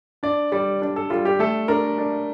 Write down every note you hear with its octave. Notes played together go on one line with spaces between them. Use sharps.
D4 D5
G3 D5
D4
A4
G3 F4
G4
A3 A4
D4 A#4
D4